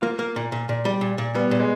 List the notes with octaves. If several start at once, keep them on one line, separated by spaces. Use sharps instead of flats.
A#3 F4
A#3
A#2
A#2
A#2
G3
A#2
A#2
G3 B3
A#2
G#3